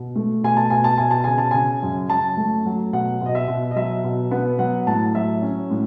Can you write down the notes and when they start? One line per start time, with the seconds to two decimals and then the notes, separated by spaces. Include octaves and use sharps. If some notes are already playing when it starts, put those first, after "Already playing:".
Already playing: B2
0.16 A3
0.43 B2 G#5
0.57 A5
0.70 B2 G#5
0.84 A5
0.98 B2 G#5
1.11 A5
1.24 C#3 G#5
1.38 A5
1.51 C#3 G#5
1.83 F#2
2.10 F#2 A5
2.37 A3
2.66 F#3
2.93 B2 F#5
3.21 B2 D#5
3.35 E5
3.48 B2
3.71 D#5
3.76 F#3 E5
4.04 B2
4.31 B3
4.59 F#3 F#5
4.87 A2 A5
5.15 F#3 E5
5.42 C#4
5.70 A2